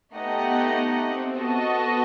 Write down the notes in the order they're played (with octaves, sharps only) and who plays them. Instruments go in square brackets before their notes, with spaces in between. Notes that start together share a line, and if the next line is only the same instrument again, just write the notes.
[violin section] A3 D#4 G4 D#5 F#5 [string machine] B3
[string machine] B3
C4
[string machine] B3 [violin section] F#4 A4 D#5 A5
[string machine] B3